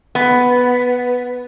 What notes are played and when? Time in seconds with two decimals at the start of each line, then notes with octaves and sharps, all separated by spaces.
0.15 B3